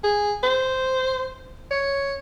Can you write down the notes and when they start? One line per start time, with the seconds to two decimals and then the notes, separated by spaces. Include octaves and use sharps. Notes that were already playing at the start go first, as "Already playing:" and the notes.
0.04 G#4
0.43 C5
1.71 C#5